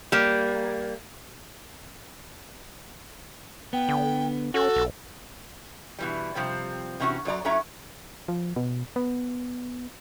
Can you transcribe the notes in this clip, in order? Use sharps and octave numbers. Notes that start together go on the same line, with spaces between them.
G3 A#3
B3 G5
D3
C#4 F#4 A4
B1
B2 E3 G3
C3 F3 G3 C4
C3 E3 C#4 D4 F#4
F#2 F#3 D5 A#5
A2 F#3 C#4 C#5 E5 A#5
F3
B2
B3